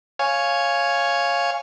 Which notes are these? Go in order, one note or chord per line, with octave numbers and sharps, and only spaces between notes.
C#5 F5 G#5